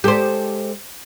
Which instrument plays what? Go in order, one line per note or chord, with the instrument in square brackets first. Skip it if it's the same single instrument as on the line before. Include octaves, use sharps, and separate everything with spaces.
[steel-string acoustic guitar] G#3 A4 A5 [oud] G4 C5